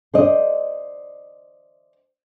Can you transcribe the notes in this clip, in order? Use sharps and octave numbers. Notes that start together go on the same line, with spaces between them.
C5 D5 D#5